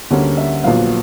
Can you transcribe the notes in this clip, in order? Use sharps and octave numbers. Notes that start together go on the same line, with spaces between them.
D2 D3 G3 A#3 C#4
E5
A#1 A#2 F#3 B3 F5